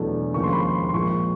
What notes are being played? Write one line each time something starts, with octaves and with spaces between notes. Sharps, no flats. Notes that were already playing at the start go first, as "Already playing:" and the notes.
Already playing: E2 B2 F#3 A3 D4
D#2 C#3 F3 G#3 C#6
C6
B5
C6
C6
A#1 A#2 F3 G#3 C#6